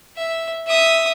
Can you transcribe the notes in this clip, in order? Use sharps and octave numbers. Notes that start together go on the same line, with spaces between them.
E5
E5 D#6